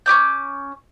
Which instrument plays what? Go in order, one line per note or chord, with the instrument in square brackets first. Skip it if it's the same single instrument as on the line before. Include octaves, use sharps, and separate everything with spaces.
[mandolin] C#4 G4 D6 G6